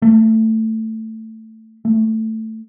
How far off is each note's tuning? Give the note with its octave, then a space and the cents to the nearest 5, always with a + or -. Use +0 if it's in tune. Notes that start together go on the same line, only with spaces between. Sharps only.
A3 +15
A3 +10